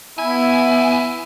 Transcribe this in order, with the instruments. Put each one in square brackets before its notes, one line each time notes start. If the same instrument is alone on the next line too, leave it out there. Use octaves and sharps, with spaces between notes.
[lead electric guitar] E2 G#5 [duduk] B3 [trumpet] E4